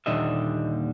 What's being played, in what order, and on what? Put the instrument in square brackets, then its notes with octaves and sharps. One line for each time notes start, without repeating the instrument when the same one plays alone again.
[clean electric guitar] D#2 A#2 D3 G3 D#5 E5